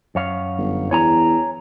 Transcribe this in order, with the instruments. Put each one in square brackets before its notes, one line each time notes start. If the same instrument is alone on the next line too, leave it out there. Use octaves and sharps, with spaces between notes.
[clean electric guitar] F#2 C#5 F5
[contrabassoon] G1
[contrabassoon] E2 [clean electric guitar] C#5 G#5 A#5